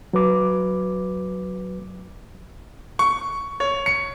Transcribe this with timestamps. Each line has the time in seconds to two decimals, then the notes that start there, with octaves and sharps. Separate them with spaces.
0.13 F#3 B4 D6
2.99 C#6
3.60 C#5
3.86 C#7